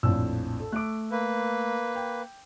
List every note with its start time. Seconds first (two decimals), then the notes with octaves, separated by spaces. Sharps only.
0.03 A#1 F2 A2 E6
0.60 A4
0.72 A3 D6 F#6 D7
1.11 A#3 B4
1.96 G5